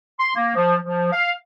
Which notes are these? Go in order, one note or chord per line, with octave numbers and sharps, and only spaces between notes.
C6
A#3
F3
F3
F5